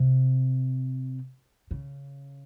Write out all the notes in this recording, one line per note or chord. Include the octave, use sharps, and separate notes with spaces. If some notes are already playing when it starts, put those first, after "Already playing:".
Already playing: C3
C#3